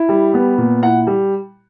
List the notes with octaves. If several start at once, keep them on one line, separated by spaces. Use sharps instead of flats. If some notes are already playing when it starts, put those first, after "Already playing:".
Already playing: E4
G3
B3
A#2
E4 F#5
G3